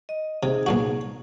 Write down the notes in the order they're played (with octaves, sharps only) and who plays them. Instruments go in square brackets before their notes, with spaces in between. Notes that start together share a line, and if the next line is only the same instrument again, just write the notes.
[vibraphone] D#5
[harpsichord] C3 [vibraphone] D#4 G#4
[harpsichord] B1 A#2 F#4